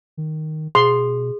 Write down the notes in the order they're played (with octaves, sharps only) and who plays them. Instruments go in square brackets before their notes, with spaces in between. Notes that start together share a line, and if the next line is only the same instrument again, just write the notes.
[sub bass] D#3
[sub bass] B2 [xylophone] G#4 [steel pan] C6